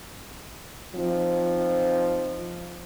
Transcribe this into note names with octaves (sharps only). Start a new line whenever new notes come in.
F3 C4 D#4